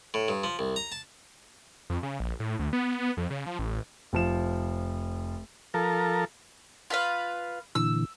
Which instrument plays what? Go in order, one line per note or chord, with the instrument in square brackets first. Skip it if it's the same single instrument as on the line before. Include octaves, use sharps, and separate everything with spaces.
[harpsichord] A2
G2
F3
C2
A#5
A5
[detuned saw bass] F2
C#3
A#1
A2
D2
B3
F2
C#3
F3
A1
[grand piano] F1 F3 E7
[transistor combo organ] F3 A4 A#4
[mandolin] F4 B4 F5
[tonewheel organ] A#2 D3 E3 [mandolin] E6